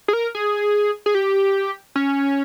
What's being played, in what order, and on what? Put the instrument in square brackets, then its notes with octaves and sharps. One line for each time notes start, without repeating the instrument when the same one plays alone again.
[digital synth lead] G#4
A#4
G#4
G#4
G4
C#4